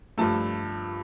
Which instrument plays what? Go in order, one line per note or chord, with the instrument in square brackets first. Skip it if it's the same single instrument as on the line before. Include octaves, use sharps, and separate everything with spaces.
[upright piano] G2 F3 A3 A5